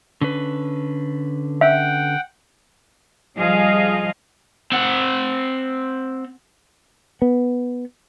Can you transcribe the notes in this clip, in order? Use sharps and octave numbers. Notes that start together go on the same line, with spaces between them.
D3 C#4 B4
E5 F#5 G5
F3 G3 G#4 D#5 F5
C4 F#5
B3